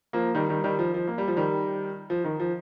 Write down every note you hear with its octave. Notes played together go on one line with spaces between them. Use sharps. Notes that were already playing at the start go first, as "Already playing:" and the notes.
F3 A#3
D#3 G3
D#3 G3
D#3 G3
F3
F3
A#3
G3
F3
D#3 G3
F3
D#3
F3